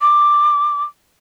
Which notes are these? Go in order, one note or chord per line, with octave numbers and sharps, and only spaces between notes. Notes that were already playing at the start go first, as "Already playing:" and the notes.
D6